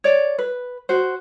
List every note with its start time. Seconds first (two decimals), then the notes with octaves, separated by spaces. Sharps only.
0.04 C#5 D5
0.39 B4
0.89 F#4 C5